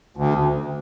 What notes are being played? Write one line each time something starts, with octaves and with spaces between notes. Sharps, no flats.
D2